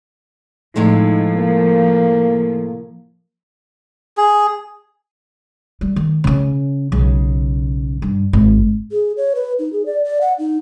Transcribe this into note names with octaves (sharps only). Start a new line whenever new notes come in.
A2 C3 F3 G#3 D#4
A#3
G#4
G3
D#3
C#3 C#4
B1 C#3
G2
G#1
G#4
C#5
B4
D#4
G#4
D5
D5
F#5
D#4